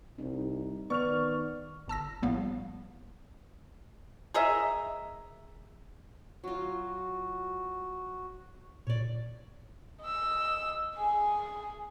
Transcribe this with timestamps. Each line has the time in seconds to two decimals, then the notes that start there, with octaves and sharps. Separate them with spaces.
0.18 C2 D#4
0.90 D#3 B3 D5 C#6 F6 F7
1.88 G1 A5 E6 A#6
2.22 A#1 A2 G3 A#3 B3 F5
4.34 G#4 A#4 D#5 E5
6.44 F#3 F4 F#4
8.87 A#2 C#5 D5
10.02 D#5 E6
10.95 G#4 G#5